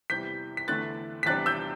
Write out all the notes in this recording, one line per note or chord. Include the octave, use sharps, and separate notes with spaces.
E2 C3 E3 G3 G6 B6
B6
E2 D3 A3 E4 F#6 A6
B6
E2 C3 G3 D4 F#6 A6
E6 G6